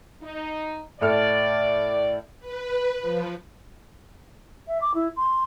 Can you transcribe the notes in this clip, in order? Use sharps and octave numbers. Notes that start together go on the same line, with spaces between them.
D#4
A2 A4 D5 F6
B4
F3
E5
D6
E4
C6